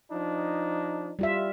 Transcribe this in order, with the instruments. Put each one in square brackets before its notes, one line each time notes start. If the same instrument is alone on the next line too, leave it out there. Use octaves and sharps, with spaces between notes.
[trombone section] F3 D4 D#4
[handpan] G3 F4 E5